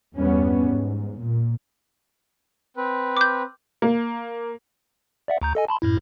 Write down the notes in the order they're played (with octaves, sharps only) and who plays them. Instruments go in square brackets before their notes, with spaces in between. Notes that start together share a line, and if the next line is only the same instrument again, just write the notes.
[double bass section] E2 G2 G3 B3 C#4
G#2
A#2
[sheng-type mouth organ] C4 B4
[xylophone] D6 G6
[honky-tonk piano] A#3
[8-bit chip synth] D5 E5 F#5
D2 A#5 G6
A4 D#5 G#5
A5 B5 C6
F#2 A2 E4